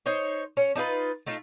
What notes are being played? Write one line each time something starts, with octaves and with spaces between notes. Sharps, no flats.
D#4 C5 C#5
C#4 C#5
D4 D#4 F4 B4
A3 D#4 F4